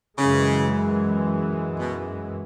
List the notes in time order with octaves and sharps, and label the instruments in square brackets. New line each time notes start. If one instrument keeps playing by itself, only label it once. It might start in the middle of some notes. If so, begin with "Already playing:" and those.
[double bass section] F#2 E3 G#3 [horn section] C#3
[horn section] B2